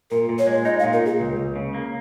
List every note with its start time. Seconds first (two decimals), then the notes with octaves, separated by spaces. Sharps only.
0.11 A#2 A#4
0.29 A#2
0.39 C#5
0.47 G#3
0.65 D#4 D#5
0.79 F5
0.84 A#2
0.93 A#4
1.01 A#2 G#4
1.20 C#2
1.37 C#2
1.56 C#3
1.74 A#3